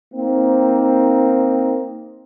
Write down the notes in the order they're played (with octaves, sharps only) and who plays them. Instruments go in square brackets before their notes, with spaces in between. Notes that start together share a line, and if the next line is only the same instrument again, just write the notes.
[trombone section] A#3 C4 D#4